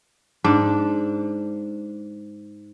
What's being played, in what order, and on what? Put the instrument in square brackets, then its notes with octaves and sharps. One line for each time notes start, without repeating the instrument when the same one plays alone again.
[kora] G#2 D4